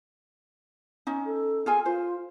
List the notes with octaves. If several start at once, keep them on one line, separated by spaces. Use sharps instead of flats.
C#4 D#4
A4
F4 G#4 G#5
F4 C5